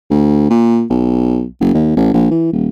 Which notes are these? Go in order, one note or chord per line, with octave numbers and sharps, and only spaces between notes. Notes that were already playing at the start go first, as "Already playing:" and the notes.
D2
A#2
B1
F#1
D#2
A1
A#1
E3
D#1